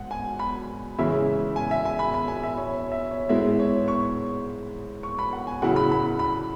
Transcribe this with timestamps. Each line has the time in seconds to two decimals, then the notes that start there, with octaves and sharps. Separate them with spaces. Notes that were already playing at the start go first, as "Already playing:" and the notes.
Already playing: G#2 F#5
0.11 G#5
0.39 B5
0.99 C#3 E3 G#3 C#4 E4 E5
1.56 G#5
1.71 E5
1.85 G#5
1.99 B5
2.14 B5
2.28 G#5
2.43 E5
2.58 C#5
2.71 C#5
2.92 E5
3.11 C#5
3.29 G#2 G#3 B3 E4 E5
3.60 C#5
3.88 C#6
5.03 C#6
5.19 B5
5.33 F#5
5.47 G#5
5.62 C#3 F#3 E4 F#5
5.76 B5
5.91 B5
6.19 B5